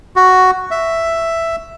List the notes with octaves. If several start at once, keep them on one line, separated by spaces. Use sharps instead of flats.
F#4
E5